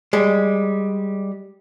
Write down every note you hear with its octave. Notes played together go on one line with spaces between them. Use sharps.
G3 G#3